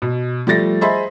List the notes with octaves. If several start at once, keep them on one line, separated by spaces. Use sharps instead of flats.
B2
F3 G3 A3 A6 A#6
G#4 C5 D#5 E5 B5 C6